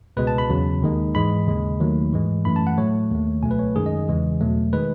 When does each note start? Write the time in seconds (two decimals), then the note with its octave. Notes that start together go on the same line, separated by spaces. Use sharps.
0.17 C#2 B2 G#3 B4
0.27 A5
0.38 B5
0.50 E2 C#3 F#3
0.82 D#2 D#3 G#3
1.15 G#2 E3 G#3 B5
1.47 D#2 C#3 G#3
1.80 D#2 D#3 F#3 A3
2.12 G#2 E3 G#3
2.45 F#2 E3 A3 B5
2.56 A5
2.67 F#5
2.77 A2 F#3 A3 C#5
3.11 D#2 D#3 A3
3.43 C#2 B2 F#3 A3 G#5
3.51 B4
3.59 C#5
3.76 F#2 D#3 G#3 G#4
3.86 D#5
4.08 E2 C#3 E3 G#3
4.41 E2 B2 F#3 A3
4.73 D#3 G#3 B4